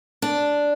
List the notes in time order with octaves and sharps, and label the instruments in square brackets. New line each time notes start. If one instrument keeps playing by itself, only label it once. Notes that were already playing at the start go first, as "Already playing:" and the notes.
[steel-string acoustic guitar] D4